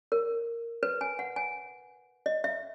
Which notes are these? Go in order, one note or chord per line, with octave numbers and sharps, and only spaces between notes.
A#4
B4
G#5
F#5
G#5
D#5
E5